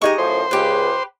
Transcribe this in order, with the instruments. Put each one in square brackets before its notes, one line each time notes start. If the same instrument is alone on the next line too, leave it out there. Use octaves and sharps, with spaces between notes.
[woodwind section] G#3 D#4 G4 [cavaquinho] D#5 G#5 C#6
[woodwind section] F#2 A2 F3 [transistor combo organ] C5
[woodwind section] C#2 [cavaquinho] G4 B4